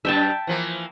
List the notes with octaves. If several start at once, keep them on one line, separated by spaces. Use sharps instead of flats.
F#2 E5 G5 A5
E3 F3 A#3